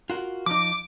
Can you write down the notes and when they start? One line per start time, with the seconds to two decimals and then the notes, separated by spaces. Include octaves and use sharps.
0.10 F4 F#4 A#4
0.46 F3 D#4 D6